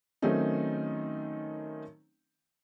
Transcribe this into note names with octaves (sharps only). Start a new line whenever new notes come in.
D#3 F#3 A3 C4 C#4 D#4